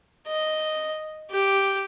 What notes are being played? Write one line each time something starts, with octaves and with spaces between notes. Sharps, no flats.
D#5
G4